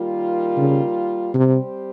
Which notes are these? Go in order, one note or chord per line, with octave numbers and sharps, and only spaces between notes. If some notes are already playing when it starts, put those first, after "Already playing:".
Already playing: D#3 G3 A#3 F4
C#3
C3 G3 C4 G4 C5